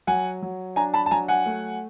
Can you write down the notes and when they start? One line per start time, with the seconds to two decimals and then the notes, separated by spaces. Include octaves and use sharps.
0.07 F#3 F#5 G#5
0.42 F#3
0.76 D4 G#5 A#5
0.94 A5 B5
1.06 A5
1.11 F#3 G#5 A#5
1.28 F#5 G#5
1.46 A3